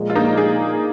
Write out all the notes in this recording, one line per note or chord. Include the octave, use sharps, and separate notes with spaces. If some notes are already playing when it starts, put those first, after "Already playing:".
Already playing: A#2 F3 G#3
F4
A#3 D#4
D#4 G#4